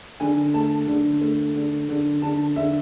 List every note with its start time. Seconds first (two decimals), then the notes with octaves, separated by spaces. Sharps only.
0.20 D3 G#5
0.54 A3 A5
0.88 D3
1.21 A3
1.56 D3
1.89 D3
2.22 D3 A5
2.56 D3 E5